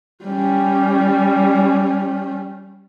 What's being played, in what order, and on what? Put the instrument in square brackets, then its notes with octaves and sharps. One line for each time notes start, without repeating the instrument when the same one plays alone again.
[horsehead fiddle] G3 C#4